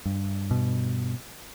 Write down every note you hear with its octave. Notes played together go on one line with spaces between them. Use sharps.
G2
B2